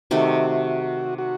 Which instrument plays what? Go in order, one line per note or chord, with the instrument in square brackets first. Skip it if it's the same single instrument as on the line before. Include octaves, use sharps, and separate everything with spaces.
[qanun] C3 D#3 A3 [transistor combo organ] F#4
[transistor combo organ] F#4